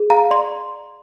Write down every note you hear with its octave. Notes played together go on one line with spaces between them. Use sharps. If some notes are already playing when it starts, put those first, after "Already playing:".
Already playing: G#4
F5 A#5
D5 C6